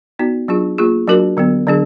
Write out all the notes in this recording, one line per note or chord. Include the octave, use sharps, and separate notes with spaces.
B3 D#4 F#4 D5
F#3 D4 F4 G#4
A#3 F4 G#4
F#3 D4 F#4 A#4
D3 F#3 B3
D3 F#3 D4 G#4